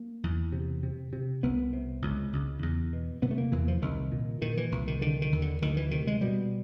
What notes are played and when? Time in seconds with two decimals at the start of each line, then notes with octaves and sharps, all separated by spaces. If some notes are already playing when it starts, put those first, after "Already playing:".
Already playing: A#3
0.24 E2
0.52 C3
0.83 C3
1.13 C3
1.43 C2 B3
1.73 C3
2.02 C#2
2.33 C#2
2.63 E2
2.93 B2
3.22 C3 B3
3.31 A3
3.38 A#3
3.52 E2 E3
3.68 F3
3.82 C2 D#3
4.12 A#2
4.42 A#2 D#3
4.57 E3
4.72 C2
4.87 D#3
5.01 D3 D#3
5.22 D#3
5.32 D#2
5.42 D3
5.62 D2 D#3
5.77 E3
5.91 C3 D#3
6.07 G#3
6.21 B2 G3